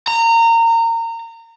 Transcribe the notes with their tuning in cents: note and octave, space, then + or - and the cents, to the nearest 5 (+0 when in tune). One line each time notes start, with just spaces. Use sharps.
A#5 -25